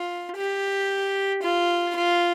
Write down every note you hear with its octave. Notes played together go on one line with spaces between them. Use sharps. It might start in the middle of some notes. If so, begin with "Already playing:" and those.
Already playing: F4
G4
F4
F4